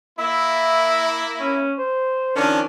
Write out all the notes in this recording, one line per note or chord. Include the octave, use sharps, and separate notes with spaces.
A#3 E4 E5
C#4
C5
D#3 F3 C#4 D4